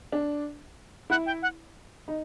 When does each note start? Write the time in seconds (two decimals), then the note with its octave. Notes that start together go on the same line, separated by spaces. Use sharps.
0.12 D4
1.10 E4 F#5
1.26 G5
1.42 F#5
2.08 D#4